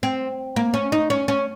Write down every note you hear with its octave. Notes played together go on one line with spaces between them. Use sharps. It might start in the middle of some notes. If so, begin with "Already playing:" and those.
C4
A#3
C#4
D#4
C#4
C#4